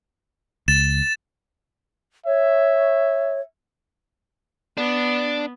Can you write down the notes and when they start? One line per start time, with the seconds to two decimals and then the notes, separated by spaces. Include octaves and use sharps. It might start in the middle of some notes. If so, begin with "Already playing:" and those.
0.68 C#2 A6 E7
2.26 C#5 E5
4.78 B3 D4